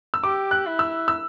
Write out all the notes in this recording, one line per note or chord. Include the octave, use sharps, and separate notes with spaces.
E6
G4 D6
F#6
E4
E6
E6